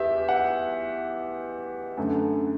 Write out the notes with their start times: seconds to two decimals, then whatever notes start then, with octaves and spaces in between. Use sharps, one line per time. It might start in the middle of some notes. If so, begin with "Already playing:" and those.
Already playing: E2 G4 E5
0.29 F#5
1.97 F#2 D3 A3